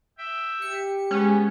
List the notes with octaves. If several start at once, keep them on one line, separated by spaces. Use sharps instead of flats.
E5 G5
G4 C#7
G#3 B3 C#4